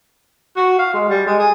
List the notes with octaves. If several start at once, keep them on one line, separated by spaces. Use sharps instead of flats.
F#4
F5
G#3
G3
G#3
G#4